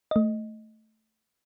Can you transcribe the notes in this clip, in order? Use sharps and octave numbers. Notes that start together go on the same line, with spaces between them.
A3 D#5